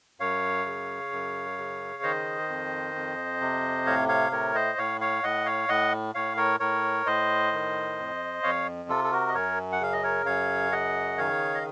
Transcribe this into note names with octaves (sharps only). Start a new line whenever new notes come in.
F#2 C#5 F5
C#3
F#2
C#3
D#3 C5 D#5
F2
F2
C3
A2 C#5 F5
C#5 F5
A2 A#4 C#5
C5 D#5
A2 C#5 F5
C#5 F5
A2 D#5 F#5
C#5 F5
A2 D#5 F#5
A2 C#5 F5
A#4 C#5
A2 A#4 C#5
A2 C5 D#5
D#3
F2
F2 C#5 F5
C3 F4 A4
A4
F#4 A#4
D#5
F#2 A#4 C#5
F#5
C#3 F5
D#5
A#4 C#5
F#2 C#5 F5
C#3 D#5 F#5
D#3 C#5 F5
D#5